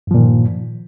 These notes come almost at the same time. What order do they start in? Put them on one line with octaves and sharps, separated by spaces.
G2 F3 A#2 D#3